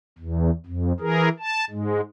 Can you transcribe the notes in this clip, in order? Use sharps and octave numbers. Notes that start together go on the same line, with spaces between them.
E2
F2
E3 G#4 A#4
A5
G#2 G#3